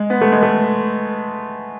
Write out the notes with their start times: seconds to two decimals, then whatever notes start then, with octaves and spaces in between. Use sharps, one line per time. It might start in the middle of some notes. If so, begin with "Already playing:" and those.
Already playing: G#3
0.10 B3
0.21 A3
0.32 G#3
0.43 A3